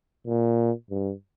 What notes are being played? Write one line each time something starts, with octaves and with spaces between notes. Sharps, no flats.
A#2
G2